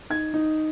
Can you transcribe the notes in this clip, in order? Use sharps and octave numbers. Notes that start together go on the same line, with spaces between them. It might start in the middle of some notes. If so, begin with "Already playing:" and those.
D#4 G#6
D#4